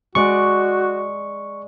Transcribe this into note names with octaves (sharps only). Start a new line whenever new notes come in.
G#3 F#4 D5 C#6